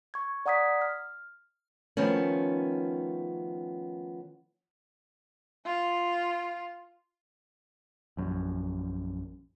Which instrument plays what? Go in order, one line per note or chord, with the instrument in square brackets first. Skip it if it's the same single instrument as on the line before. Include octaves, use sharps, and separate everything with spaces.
[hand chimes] C#6 G#6
D5 F#5 A#5 D#6 G#6 B6
F6
[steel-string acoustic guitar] D#3 F3 A3 B3 C#4
[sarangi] F4
[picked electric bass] A#1 F#2